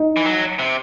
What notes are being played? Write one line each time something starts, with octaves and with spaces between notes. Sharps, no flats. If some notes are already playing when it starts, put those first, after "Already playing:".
Already playing: D#4
E3
F#3
C3